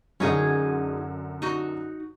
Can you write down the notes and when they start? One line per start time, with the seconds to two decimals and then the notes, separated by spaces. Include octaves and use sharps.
0.20 F#2 D3 C#4 D#4 G#4
1.42 D#4 F#4